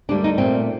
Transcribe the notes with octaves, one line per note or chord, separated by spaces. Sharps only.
D2 D3 G3 A#3 D4
D#4
A#2 A3 C4